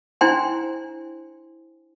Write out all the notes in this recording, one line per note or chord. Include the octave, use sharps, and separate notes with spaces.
D4 E4 C5 G5 G#5 C6